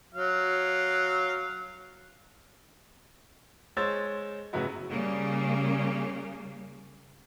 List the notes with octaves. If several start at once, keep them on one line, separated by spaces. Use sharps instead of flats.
F#3 F5
G#3 C5 C#5 E6 A6
A2 C#3 F#3 B3 E4 F#4
C#3 G3 A#3